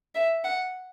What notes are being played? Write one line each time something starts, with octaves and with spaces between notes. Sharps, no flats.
E5
F#5